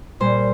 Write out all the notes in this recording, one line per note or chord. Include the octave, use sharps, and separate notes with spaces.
A#2 G3 C5